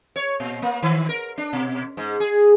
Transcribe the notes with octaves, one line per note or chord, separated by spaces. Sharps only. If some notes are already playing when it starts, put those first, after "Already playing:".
C#5
A#2
A#3
D#3
A#4
D4
B2
G#2
G#4